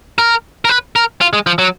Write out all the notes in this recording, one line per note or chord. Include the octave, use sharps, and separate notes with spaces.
A#4
A#4
B4
A#4
F4
G#3
F3
F#3